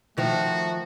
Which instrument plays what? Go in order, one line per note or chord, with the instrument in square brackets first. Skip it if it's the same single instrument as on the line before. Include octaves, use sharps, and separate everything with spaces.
[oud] D#3 F3 [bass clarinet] A3 [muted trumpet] F#4